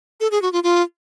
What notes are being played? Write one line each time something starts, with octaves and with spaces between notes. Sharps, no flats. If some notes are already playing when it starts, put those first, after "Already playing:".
A4
G#4
F#4
F4
F4